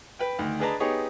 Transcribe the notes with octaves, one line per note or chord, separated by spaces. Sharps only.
B4 G5
D2 D#3
D4 G#4 B4 D#5 A5 A#5
B3 D#4 G4 G#4 C#5